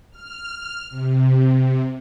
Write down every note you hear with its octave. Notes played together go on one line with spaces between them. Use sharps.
F6
C3